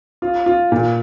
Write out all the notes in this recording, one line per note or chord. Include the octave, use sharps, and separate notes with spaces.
F4
F4
A#2